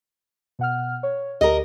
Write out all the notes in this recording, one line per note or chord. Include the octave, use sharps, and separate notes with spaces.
B2 F#5 F6
C#5
D2 G4 A#4 D#5 A#6